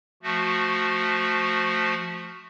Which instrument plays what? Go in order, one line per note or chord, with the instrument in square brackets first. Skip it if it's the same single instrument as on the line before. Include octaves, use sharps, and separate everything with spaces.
[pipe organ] F3 A3 F#4